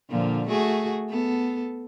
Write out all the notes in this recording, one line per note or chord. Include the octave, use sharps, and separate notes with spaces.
A#2 D3 F3
A3 F#4 G#4
B3 A4